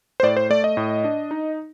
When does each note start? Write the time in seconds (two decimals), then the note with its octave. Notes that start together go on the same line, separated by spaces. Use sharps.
0.20 C5
0.23 A2 D5
0.37 C5
0.50 A3 D5
0.64 D#5
0.77 A2
1.04 D4
1.31 D#4